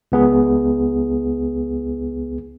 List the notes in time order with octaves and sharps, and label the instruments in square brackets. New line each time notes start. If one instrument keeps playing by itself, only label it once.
[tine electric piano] C#2 B3 G#4